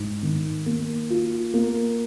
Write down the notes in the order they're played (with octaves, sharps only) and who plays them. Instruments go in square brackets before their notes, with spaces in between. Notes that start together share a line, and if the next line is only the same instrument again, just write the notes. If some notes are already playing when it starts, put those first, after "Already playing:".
Already playing: [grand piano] G#2
D#3
A#3
F4
A#3